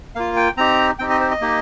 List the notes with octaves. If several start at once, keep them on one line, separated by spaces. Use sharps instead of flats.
A#3 F4 F5
G5
C4 D#4 G4 A#5
C4 D#4 G4 G5
D#5
C5
D#5
A#3 D#4 G4